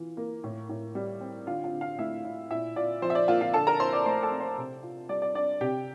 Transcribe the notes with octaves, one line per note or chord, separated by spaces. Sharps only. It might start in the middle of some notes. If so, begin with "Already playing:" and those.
Already playing: E3 F4
A#3
A2
A2
G3
C4
D3 F4 F5
F4 F5
D3
F4 F5
A3 E4 E5
E4
A#2 E4 E5
F4 D5
F3 C5
E5
D5
A#3 F4 F5
F4 F5
D3 A4 A5
A#4 A#5
E4 C5 C6
D5 D6
A3 C5 C6
A4 A5
C4
C5
C3
F4
G3 D5
D5
D4 D5
C3 G4 G5